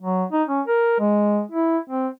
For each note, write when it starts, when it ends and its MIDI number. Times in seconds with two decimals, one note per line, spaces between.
0.02 0.24 54
0.32 0.43 63
0.49 0.61 61
0.67 0.96 70
1.00 1.41 56
1.51 1.78 64
1.89 2.08 60